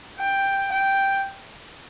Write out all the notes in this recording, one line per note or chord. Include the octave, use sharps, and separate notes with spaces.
G5
G5